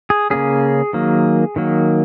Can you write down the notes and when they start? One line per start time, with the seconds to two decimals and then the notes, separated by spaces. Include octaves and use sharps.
0.10 G#4
0.30 C#3 A#3 C#4 G#4
0.93 D#3 F#3 A#3
1.56 D#3 F#3 A#3